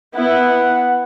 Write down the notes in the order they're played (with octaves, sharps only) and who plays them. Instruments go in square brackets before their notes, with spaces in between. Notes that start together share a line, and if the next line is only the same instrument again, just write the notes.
[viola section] B3 E4 [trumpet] F#5